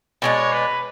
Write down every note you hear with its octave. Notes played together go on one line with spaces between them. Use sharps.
B2 G#3 D4 C#5
B4